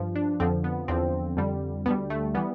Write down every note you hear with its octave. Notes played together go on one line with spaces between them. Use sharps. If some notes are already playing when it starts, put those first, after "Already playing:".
Already playing: G2 F3
D4
F2 D3 F3 C4
B3
E2 D3 F3 C4
F2 D3 G3
D2 D3 G3 B3
A3
E3 G3 B3